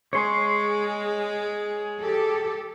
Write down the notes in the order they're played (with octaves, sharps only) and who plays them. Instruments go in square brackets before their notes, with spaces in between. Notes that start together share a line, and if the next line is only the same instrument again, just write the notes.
[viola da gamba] G#3 [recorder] G#4 [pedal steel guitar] C#5 C6
[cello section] G4 A4